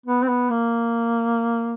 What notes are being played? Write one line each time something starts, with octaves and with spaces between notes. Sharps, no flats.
B3
C4
B3
A#3